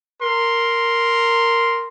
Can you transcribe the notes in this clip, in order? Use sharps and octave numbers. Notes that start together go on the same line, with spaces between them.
A#4 C6